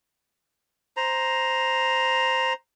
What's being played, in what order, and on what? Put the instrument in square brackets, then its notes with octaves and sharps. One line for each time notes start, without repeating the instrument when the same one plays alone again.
[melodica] C5 A#5